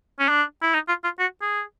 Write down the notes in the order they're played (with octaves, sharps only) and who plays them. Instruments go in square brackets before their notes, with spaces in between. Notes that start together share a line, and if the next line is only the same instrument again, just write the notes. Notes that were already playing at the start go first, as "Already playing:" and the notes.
[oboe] C#4
D4
E4
D#4
F4
F4
F#4
G#4